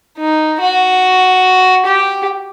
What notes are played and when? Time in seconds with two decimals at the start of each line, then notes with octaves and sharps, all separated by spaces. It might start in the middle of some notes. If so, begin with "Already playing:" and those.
0.18 D#4
0.61 F#4
1.86 G4